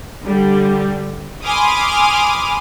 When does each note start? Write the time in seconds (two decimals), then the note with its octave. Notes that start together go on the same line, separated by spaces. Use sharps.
0.22 D3 G3
1.45 G#5 B5 C6 D6 D#6 F6